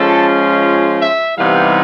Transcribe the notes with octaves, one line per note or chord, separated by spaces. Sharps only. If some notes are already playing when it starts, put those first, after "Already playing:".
Already playing: F3 G#3 C#4 F4 A4
E5
C3 E3 G3 B3 D#4 F5